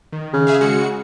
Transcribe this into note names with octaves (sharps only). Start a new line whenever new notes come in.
D#3
C#3
G#4 E5 F5
G#3 F#4 C#7